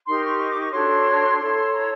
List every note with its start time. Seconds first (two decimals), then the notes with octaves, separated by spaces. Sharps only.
0.06 D#4 G4 A#4 C6
0.24 C#6
0.39 C#6
0.50 D6
0.62 C#6
0.72 D4 F#4 A4 C#5 C6
1.39 E4 A4 C#5
1.73 A#5